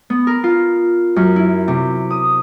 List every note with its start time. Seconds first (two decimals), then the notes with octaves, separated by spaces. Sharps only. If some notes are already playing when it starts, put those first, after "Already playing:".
0.10 B3
0.27 A#4
0.44 F4
1.16 F#2
1.36 E4
1.68 C3
2.10 D#6